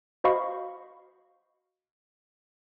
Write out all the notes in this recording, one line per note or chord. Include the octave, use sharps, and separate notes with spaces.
F#4 C5 D#5 F5 B5 C#6